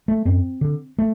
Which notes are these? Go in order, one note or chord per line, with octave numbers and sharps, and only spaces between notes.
A3
F#2 C4
D3
A3